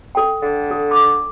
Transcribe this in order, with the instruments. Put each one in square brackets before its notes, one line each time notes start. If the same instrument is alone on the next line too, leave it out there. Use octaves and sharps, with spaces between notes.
[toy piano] A4 G5
[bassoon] D3
[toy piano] A4
D6